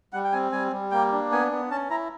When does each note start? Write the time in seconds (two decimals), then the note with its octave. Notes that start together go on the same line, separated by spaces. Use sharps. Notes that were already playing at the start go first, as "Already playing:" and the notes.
0.13 G3 F#5
0.24 G5
0.32 C4 G#5
0.52 G3 G#5
0.72 G3
0.91 A#3 G5
1.12 D4
1.31 B3 G#5
1.52 B3
1.70 C#4 A5
1.90 E4 A#5